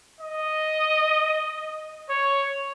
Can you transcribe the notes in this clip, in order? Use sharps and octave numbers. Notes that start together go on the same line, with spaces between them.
D#5
C#5